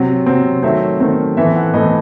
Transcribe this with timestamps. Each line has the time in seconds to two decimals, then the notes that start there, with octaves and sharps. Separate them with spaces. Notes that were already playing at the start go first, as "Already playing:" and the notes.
Already playing: C3 F#3 C4
0.26 C3 F#3 C4
0.63 D#3 F#3 A3 C4 E5
1.00 D#3 F#3 A3 C4
1.37 A2 E3 A3 C4 E5
1.56 F#5
1.74 A2 E3 A3 C4 D#5